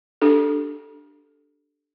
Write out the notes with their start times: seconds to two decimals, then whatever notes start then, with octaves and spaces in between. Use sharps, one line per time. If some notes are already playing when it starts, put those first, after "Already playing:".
0.22 D4 G4 A4